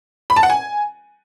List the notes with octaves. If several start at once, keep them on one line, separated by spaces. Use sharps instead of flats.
B5
A5
F#5
G#5